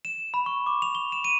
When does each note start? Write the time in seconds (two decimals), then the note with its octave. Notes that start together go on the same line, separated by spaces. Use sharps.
0.05 E7
0.34 B5
0.46 C#6
0.66 D6
0.82 F7
0.95 G7
1.12 E7
1.24 D#7